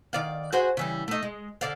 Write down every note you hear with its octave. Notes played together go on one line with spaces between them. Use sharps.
D#3 D5 F5
F#4 G#4 C5
C#3 E3 G3
A3 D#4
G#3
D3 D5 F5